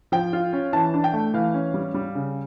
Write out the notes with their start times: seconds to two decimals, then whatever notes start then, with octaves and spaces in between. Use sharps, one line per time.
0.12 F3 G5
0.33 F4
0.53 C#4
0.73 E3 A5
0.94 D4
1.04 G5
1.13 A3
1.34 E3 F5
1.54 C#4
1.74 G3
1.94 G3
2.15 C#3